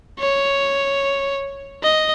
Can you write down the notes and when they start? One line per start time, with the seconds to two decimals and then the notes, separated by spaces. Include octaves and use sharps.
0.19 C#5
1.83 D#5